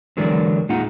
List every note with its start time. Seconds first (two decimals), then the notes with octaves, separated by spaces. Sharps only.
0.17 D3 E3 F#3 G#3 A#4 D5
0.69 A#2 G#3 D#4 F4 F#5 A#5